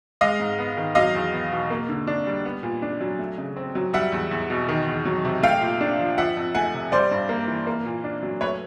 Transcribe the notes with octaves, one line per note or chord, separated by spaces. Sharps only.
G#3 D#5 F5
G#2
B3
D#3
F#3 D#5 F5
E2
B3
B2
A#3
D3
D4
G3
B3
A#2
D4
F#3
A3
C#3
C4
F#3
G3 E5 F#5
E2
E2
B2
D#3
E2
F#3
C3
A3 F5 G5
A#2
D4
F3
F3 E5 F#5
F2
A3 F#5 G#5
C3
G3 C5 D5
G2
A#3
E3
A#3
A#2
D4
F#3
A3 B4 C#5